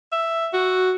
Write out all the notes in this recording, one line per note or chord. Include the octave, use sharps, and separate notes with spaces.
E5
F#4